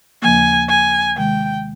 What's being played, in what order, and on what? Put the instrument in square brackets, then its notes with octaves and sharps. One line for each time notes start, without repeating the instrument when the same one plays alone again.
[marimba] D#2 C#3 F3 A#3 [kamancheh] G#5
[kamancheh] G#5
[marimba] C3 D#3 G#3 [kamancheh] G5